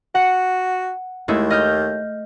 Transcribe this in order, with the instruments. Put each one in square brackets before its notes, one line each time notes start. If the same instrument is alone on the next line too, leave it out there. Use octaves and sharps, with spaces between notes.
[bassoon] F#4 [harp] F#5
[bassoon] D#2 [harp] G#3 A3 E4
[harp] D#5 F6 G6